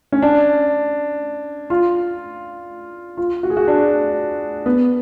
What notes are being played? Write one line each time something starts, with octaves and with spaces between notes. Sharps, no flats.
C#4
D4
F4
F4
F#4
G#4
F#4
D4
B3